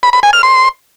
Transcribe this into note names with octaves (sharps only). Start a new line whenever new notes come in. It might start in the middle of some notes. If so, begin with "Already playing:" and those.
B5
B5
G#5
F6
C6